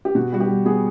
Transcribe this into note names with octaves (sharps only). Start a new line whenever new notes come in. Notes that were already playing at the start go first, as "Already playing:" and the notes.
G4
B2 F#4
G3 F#4
G4
G3
B3 G#4